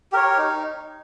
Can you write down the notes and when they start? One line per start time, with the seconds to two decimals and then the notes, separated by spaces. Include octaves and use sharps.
0.12 G4 A#4 C#5
0.38 D#4